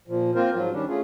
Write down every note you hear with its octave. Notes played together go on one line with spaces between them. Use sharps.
A#2 F3
A#3 C4 F4 A#4 C5
G#2 F3 F#3 F4
D#3 G3 C#4 D4
A3 C#4 F4 G#4